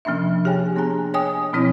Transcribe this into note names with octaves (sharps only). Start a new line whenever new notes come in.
C3 F3 A#3 C#4 D4 E5
G4 G#4 C#5 G5 G#5
A#3 B3 D4 G#4 G#5 A#5
C#5 D#5 G5 G#5 D#6
B2 F3 C4 E4 C#5 D#6